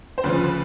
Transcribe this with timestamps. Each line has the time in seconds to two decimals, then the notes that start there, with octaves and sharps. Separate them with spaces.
0.18 C5
0.24 D2 C#3 F3 B4